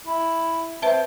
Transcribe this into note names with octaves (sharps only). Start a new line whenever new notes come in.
E4
C4 B4 E5 A5